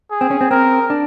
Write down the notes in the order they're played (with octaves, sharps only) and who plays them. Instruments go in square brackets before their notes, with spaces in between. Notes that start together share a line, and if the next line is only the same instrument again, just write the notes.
[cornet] G#4
[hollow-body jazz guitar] C4
C#4
C4
[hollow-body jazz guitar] C4 [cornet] A#4
[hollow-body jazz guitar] D4